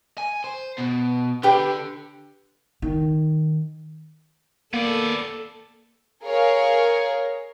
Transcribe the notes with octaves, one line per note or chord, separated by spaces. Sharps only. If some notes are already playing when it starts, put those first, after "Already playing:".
G#5
C5
B2
D3 D4 G4 B4
D#3
A#3 B3 A4 D5
G#4 A#4 C#5 F5